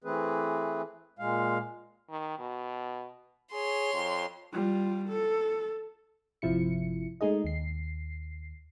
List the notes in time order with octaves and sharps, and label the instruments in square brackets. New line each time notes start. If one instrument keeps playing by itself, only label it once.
[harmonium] E3 A3 C4 G#4 B4
A#2 G#3 F5
[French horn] D#3
B2
[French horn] G#4 [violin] C#5 C6
[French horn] F2
[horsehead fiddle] G3 F4
A4
[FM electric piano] G1 C3 F3 E4 C#7
G#3 A3 D#4 G#4 D#5
D#2 C7